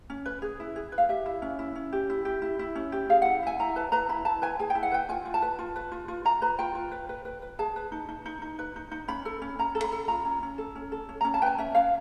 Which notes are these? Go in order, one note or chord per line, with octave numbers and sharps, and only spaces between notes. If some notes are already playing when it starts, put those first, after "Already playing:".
C#4
B4
G#4
E4
G#4
B4
F5
G4 E5
E4
C#4
E4
C#4
G4
E4
G4
E4
E4
C#4
G4
G#4 F5
E4 F#5
E4 G#5
E4 A#5
B4 A5
B4 A#5
E4 B5
E4 A5
B4 G#5
G#4 G#5
G5
E4
F#5
B4 G5
F4 G#5
F4
A5
B4
F4
B4
F4
F4
F4 A#5
B4 B5
F4 G5
F4
B4
B4
B4
B4
G#4 A5
B4
D#4
D#4
D#4
D#4
B4
D#4
D#4
C#4 B5
A4
C#4
C#4 A#5
A4
B5
A4
F4 A#5
C#4
C#4
A4
C#4
A4
C#4
C#4 A#5
A5
B4 G5 G#5
C#4 E5
C#4 F5